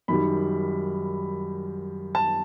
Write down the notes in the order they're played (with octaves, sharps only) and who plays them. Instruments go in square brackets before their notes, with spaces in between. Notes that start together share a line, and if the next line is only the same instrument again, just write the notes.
[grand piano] F#2 D#3 G3 B5
A5